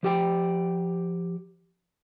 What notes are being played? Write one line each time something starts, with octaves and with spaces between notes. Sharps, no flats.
F3 G4 G5